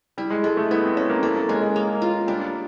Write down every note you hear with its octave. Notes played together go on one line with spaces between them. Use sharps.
G3 E4
G#3
G#3 A4
A3
B3 E4
C4
C#4 A4
A#3
A#3 A4
A#3
G#3 C#4
G#3
A#3
F4
G3 D4